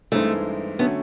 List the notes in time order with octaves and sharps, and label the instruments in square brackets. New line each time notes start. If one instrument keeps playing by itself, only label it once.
[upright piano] G2 E3 G#3 C4 D#4 [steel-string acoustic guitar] A3
[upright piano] D3 F#3 A3 C#4 [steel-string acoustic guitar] B3